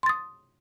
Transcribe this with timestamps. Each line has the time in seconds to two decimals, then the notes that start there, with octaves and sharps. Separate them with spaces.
0.03 C6
0.06 A6
0.09 D#6